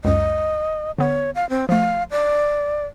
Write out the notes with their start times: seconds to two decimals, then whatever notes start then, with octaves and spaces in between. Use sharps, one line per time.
0.04 C#2 F#2 D#5
0.98 D3 B3 C#5
1.35 F5
1.50 C4
1.69 F3 A3 F5
2.11 D5